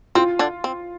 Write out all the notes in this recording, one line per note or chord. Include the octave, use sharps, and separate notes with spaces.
C4 F4
D3 D4
C4